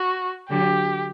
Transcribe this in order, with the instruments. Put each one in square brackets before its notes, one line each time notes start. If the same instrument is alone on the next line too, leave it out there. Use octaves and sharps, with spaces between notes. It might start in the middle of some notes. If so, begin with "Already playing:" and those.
Already playing: [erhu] F#4
[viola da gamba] D3 F#3 [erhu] G4